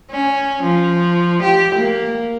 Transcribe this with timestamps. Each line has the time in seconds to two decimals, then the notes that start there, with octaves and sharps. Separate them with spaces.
0.10 C#4
0.63 F3
1.43 G4
1.75 A#3